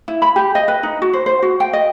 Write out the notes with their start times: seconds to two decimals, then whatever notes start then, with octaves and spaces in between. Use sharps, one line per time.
0.08 E4
0.22 B5
0.36 G4
0.55 D#5
0.68 B4
0.83 D#4
1.02 F#4
1.13 C5
1.26 C5
1.42 F#4
1.60 G5
1.73 D#5